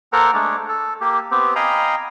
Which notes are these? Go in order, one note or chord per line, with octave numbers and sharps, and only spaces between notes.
A#3 A4 A#4 C5 F#5 A#5
G#3 A3 D4
A4
A#3 G4
B3 C4 G4
D#5 F5 G5 G#5 A#5 B5